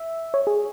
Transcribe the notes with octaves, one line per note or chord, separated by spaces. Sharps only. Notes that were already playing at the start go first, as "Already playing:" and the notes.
Already playing: E5
C#5
G#4